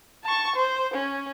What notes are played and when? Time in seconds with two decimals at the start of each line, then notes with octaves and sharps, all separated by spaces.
0.24 A5 C#6
0.56 C5
0.94 C#4